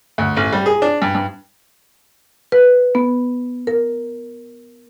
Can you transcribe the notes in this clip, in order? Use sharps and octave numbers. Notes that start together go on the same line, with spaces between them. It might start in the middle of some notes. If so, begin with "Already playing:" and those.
D2
A1
G3
G#4
D4
G2
G2
B4
B3
A#4